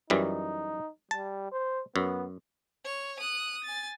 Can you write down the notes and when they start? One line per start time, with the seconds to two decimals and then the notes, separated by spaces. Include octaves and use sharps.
0.10 F#2 E3 G3 D#4
1.11 G3 A5
1.52 C5
1.96 F#2 B3
2.84 C#5
3.19 D#6 F#6
3.64 G#5 A6